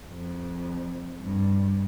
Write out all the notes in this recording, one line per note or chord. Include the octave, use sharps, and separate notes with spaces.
F2
G2